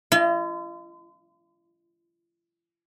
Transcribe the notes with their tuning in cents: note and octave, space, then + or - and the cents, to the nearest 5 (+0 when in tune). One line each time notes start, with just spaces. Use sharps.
F4 -45 D#5 +0